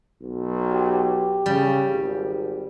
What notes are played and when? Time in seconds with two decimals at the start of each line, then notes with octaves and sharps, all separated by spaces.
0.22 B1
0.72 G4
1.46 C#3 G3
1.93 G#1